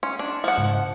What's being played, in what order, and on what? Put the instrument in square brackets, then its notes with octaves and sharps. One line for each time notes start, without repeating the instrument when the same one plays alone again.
[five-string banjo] C#4 [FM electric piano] C6
[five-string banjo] D4
F3 F#5
[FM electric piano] G#2 C#3